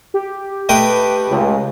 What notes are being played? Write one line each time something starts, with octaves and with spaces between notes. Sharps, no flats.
G4
A3 B4 D#5 G5
C#2